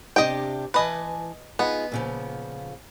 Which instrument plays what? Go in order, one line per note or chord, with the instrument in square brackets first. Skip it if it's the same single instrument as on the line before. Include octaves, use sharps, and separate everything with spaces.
[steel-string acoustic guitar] C3 D4 G4 [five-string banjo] D#5 G5
[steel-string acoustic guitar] E3 G#5 A5 [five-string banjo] B4 D#5
[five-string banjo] B3 [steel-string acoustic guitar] D#4 F4 G#4
[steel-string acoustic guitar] A#2 C#3 F3